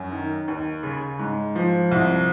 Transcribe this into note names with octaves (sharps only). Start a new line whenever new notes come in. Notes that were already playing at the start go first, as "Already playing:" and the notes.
Already playing: F#2
D#3
D#2
C#3
G#2
F3
C2